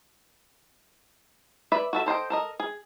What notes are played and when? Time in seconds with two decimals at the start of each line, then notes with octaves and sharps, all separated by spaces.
1.72 B4 D5 E5 B5
1.93 F#4 A4 E5
2.06 A4 C5 D#5 G5
2.30 A4 A#4 D#5
2.60 G#4